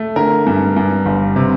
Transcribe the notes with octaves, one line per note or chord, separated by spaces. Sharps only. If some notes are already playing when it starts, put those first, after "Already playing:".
Already playing: A3
D3 A#4
G2
G2
G1
C3